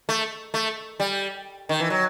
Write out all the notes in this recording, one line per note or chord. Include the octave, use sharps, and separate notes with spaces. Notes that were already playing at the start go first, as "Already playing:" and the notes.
A3
A3
G3
D#3
E3
F#3